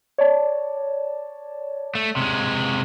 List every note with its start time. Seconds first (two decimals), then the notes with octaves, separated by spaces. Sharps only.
0.18 C#5 D5 A5
1.95 A3
2.17 C3 G#3